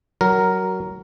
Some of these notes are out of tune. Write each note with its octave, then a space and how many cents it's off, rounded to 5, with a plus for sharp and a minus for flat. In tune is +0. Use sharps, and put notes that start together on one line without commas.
F#3 +20 A#4 +0